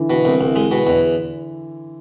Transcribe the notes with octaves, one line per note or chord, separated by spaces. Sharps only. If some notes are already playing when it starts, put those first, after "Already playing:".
Already playing: D3 E3
B2
C2
C2
G#3
B2
E2